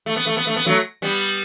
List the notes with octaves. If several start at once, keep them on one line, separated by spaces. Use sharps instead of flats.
A3
B3
A3
B3
A3
B3
F#3 A3
G3 B3